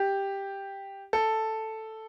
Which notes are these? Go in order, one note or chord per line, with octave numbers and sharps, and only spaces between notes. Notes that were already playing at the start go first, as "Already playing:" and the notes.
Already playing: G4
A4